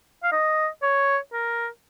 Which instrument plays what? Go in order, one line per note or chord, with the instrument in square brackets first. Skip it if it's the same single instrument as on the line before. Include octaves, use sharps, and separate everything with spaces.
[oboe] F5
D#5
C#5
A#4